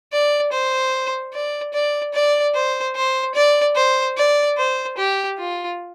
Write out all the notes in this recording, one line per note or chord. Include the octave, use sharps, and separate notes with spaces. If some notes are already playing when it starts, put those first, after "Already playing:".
D5
C5
D5
D5
D5
C5
C5
D5
C5
D5
C5
G4
F4